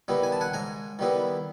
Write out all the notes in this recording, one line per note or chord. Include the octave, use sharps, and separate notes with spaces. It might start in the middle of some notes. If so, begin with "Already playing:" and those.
D#3 G3 B3 E4
G#5
A5
F#5 G#5
G#2 G#5 A#5
D#3 G3 B3 E4